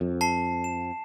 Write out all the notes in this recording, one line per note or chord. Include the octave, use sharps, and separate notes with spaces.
F2
A5 C7
E7